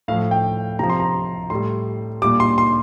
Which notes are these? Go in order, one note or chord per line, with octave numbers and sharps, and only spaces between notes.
A2 F3 F5
G5
C3 F3 A#5
C6
A#5
A2 G3 C6
A#2 G3 D6
C6
C6